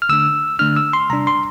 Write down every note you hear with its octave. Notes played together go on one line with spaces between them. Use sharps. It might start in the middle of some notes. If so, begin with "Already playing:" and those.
F6
D3 A3 D4 E6
D3 A3 D4 F6
E6
C6
C3 G3 D4 A#5
C6